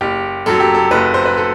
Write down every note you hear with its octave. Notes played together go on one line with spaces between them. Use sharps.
F#1 G4
F#2 F#3 A4
G4
A4
F#1 B4
C5
B4
A4